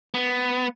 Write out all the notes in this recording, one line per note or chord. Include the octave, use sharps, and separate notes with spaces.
B3